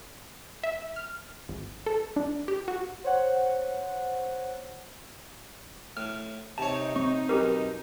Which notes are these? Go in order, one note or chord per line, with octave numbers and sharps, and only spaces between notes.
E5
F6
G#1
A4
D4
G4
F#4
C5 C#5 F#5
A2 F6
C3 D#4 C#5 A5
C4 C#6
B1 C#4 G4 A#4